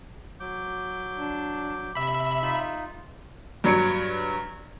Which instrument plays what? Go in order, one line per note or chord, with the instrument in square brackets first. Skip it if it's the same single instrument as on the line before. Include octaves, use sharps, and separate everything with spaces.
[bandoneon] F#3 D6 G6
[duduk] D4
[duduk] C3 [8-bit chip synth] E5 B5
[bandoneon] D#4 F4
[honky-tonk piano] G2 F#3 C#5 G#6 C#7 D7